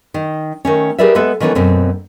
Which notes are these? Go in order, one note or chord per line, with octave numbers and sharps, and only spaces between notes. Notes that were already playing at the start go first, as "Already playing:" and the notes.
D#3
D#3 A3 C#4
G4 G#4 A#4 B4 D5 E5
G#3 B3 A4 B4 E5
D#3 E3 A3 B3 C#4
F#2 B2 A3 C4